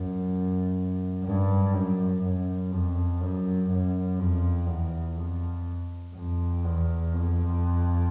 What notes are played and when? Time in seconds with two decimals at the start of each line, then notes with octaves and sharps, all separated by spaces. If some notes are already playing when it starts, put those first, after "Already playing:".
Already playing: F#2
1.24 G2
1.73 F#2
2.22 F#2
2.71 F2
3.21 F#2
3.70 F#2
4.19 F2
4.68 E2
5.17 F2
6.15 F2
6.65 E2
7.14 F2